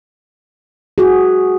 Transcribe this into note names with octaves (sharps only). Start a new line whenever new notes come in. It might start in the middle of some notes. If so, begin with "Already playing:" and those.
F#4 G#4